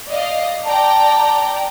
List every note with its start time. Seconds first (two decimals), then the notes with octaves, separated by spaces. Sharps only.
0.10 D5 D#5 F5
0.66 D5 G5 A5 A#5